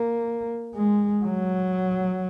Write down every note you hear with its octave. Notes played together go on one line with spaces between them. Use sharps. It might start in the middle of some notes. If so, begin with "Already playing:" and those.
Already playing: A#3
G#3
F#3